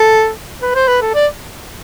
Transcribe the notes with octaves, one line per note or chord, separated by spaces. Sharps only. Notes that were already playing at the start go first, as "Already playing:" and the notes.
Already playing: A4
B4
C5
B4
A4
D5